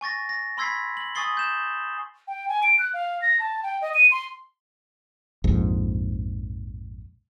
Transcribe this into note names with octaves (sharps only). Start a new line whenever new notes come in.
G#5 C#6 A6 A#6
A#6
B5 C6 E6 G#6 B6 C7
F#7
G#5 C#6 D#6 A6 C7 G7
G6 E7
G5
G#5
D7
F#6
F5
A#6
A5
G5
D#5
D#7
C6
A#1 F2 G#2